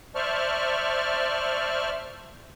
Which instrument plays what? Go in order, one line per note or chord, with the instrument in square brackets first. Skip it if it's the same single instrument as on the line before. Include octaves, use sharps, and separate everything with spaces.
[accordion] C5 D5 E5 A5 C#6 F6